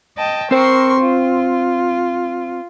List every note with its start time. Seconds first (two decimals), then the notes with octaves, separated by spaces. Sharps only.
0.17 D#5 G5 A5
0.51 C4 A#4 C5 C6 C#6
1.01 F4